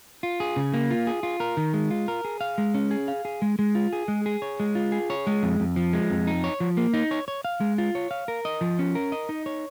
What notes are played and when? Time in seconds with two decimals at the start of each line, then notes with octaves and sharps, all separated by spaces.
0.23 F4
0.40 G#4
0.56 C#3
0.74 A#3
0.91 F4
1.07 G#4
1.23 F4
1.40 A#4
1.57 D#3
1.74 G#3
1.91 F4
2.08 A#4
2.25 G#4
2.41 F5
2.58 G#3
2.74 C#4
2.91 G#4
3.08 F5
3.25 G#4
3.42 G#3
3.59 G#3
3.75 F4
3.93 G#4
4.08 G#3
4.26 G#4
4.42 C#5
4.60 G#3
4.75 F4
4.92 G#4
5.10 C#5
5.27 G#3
5.43 F2
5.60 F2
5.76 F3
5.93 G#3
6.10 F2
6.27 D#4
6.44 C#5
6.60 F3
6.77 A#3
6.94 D#4
7.11 C#5
7.28 C#5
7.45 F5
7.61 G#3
7.78 F4
7.95 C#5
8.11 F5
8.28 A#4
8.45 D#5
8.61 F3
8.79 C#4
8.95 A#4
9.12 D#5
9.29 D#4
9.46 C#5